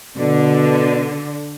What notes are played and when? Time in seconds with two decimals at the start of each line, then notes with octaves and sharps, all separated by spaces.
0.18 B2 D3